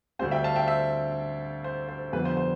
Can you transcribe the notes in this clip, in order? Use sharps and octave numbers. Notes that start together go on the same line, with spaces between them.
D2 D3 G3 C4 C5
E5 G5
F5 A5
E5 G5
C5 E5
C5
C5
F2 D3 G3 B3 B4
C5
C5